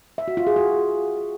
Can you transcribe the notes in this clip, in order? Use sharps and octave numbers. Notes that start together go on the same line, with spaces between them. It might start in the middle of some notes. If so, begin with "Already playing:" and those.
E5
F#4
F4
G#4
F#4